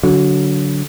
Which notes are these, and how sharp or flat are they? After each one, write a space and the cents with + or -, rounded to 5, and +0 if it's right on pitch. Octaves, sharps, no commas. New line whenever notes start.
D3 -25 F#3 +0